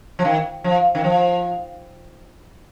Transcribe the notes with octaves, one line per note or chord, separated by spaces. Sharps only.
F3
D#3
F3
D#3
F3